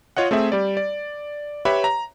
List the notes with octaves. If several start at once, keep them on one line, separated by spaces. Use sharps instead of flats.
F4 C#5 D#5 F#5
A3 C4 G#4 E5
G3 D5
D5
G4 B4 C#5 E5 B5
A#5